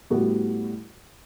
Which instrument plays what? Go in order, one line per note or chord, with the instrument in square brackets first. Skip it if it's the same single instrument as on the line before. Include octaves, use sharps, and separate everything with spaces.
[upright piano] A2 G3 B3 F#4